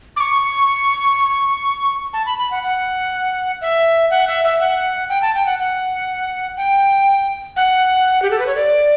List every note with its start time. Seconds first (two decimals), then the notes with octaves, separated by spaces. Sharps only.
0.16 D6
0.20 C#6
2.13 A5
2.26 B5
2.38 B5
2.51 F#5
2.63 F#5
3.61 E5
4.10 F#5
4.28 E5
4.44 E5
4.60 F#5
5.09 G5
5.22 A5
5.34 G5
5.46 F#5
5.59 F#5
6.57 G5
7.56 F#5
8.22 G4
8.31 A4
8.39 B4
8.47 C#5
8.55 D5